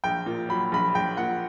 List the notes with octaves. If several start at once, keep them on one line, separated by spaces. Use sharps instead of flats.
A#1 G5
A#2
F#3 B5
A#1 B5
A#1 G5
A#2 F#5